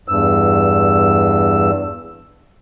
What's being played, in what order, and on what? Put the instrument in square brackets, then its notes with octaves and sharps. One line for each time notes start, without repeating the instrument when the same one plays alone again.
[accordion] E2 G2 E6